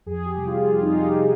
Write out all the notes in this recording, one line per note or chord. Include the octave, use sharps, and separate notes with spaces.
F2 G#4
G4
C3 G3
F4
F2 F4
D#4
F4
C3 G3
G4